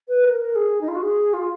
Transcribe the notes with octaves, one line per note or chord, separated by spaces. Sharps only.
B4
A#4
A#4
G#4
D#4
F4
F#4
G#4
F4